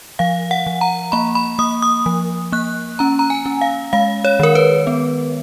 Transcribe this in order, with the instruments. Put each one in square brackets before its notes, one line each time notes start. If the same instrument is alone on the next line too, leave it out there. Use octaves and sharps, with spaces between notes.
[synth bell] F3 F5
F#5
F3
A#5
A#3 B5
B5
A#3 D#6
D#6
F3
A#3 F#6
C#4 A#5
A#5
G#5
C#4
F5
G#3 F5
C#5
D#3 A#4
B4
B3